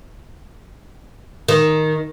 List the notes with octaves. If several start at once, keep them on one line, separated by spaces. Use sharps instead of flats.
D#3